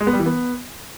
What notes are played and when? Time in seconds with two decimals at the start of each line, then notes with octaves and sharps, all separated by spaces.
0.01 G#3
0.07 B3
0.13 G3
0.20 E3
0.26 B3